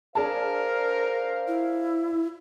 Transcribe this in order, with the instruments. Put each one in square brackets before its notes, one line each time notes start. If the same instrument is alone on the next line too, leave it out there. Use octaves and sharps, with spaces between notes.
[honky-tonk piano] D4 G#4 A5 [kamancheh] A#4 [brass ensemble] C5 F5
[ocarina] E4